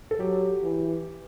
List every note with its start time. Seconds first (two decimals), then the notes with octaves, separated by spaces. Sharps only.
0.11 A4
0.19 F#3 G4
0.63 E3